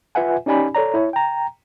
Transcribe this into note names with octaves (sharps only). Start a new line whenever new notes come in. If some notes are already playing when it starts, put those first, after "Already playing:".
F4 B4 E5 F#5 G#5
C#4 D#4 G4 D5 G#5 B5
A4 C#5 D5 A#5
E4 C#5
G5 A#5